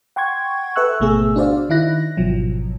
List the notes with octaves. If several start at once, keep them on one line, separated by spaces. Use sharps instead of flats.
F#5 G5 C6 C#6 G#6
A4 B4 E5 C#6 E6 F#6
G#1 B2 A3 B3 G#4 E6
D4 F#4 C5 D5 F5
D#3 D#4 E4 F#6 A#6
G#1 B2 F3 F#3